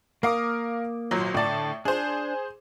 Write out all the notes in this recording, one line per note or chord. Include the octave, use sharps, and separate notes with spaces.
A#3 A#4 F5 D6 D#6
G#1 A#2 F#3
A2 D3 D5 A5
D4 G#4 C5